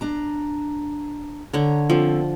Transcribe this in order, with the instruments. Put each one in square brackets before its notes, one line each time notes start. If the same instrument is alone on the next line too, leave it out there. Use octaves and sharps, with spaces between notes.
[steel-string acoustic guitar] D4 A#5
[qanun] D3 C#5 [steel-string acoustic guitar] A#5
[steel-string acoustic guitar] D3 C4 [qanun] F3